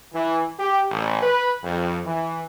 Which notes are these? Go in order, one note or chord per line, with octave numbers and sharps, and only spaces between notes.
E3
G4
A1
B4
F2
E3